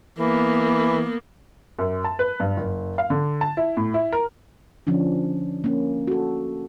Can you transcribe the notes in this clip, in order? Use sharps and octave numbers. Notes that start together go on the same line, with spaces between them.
E3 A#3 B3
F#2
A5
B4
G2
F#1
F5
D3
A5
E4
A2
E4
A#4
D3 F3 C#4 D4
A#3 C#4
F#4 A4